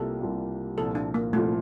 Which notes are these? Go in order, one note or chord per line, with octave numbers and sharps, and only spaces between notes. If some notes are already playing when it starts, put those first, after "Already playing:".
Already playing: C2 C3 G3 A#3 F4 A4
C2 C3 G3 A#3 F4
C2 A#2 F3 A4
D4
A#3
C2 A#2 F3 A3